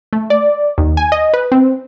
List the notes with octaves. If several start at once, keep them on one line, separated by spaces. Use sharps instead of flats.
A3
D5
D#2
G#5
D#5
B4
C4